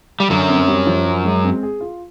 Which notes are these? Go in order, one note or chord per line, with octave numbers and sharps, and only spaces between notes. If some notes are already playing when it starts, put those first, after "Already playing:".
G3
F#2 D3 F#3
C4
G3
F3
C#4
G#3
C4
G#4
F4